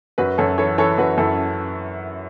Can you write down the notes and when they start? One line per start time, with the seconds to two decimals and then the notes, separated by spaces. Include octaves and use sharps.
0.18 F#2 F#4 B4
0.38 F#2 A4 C#5
0.58 E3 A4 C#5
0.78 E3 A4 C#5
0.98 F#2 F#4 B4
1.18 F#2 E4 A4